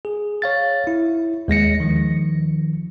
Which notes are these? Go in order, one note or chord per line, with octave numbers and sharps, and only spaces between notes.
G#4
C#5 F5 A6
E4
D#2 G#3 A#6 C#7
D#3 F3